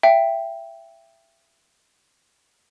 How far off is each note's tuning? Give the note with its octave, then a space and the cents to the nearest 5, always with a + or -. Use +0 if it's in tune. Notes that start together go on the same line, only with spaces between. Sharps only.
E5 +20 G5 +0